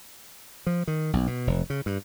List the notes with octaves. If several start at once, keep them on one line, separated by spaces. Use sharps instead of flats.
F3
D#3
B1
B2
F1
C#3
G2